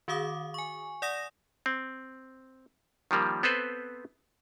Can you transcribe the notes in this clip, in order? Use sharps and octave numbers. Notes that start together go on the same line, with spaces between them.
D#3 F#4 G#4 F5 D6 D#6
G#5 C#6
D5 F#5 D#6 A#6 E7
C4
D#3 F3 G3 A#3
B3 C4 A4 B4 C5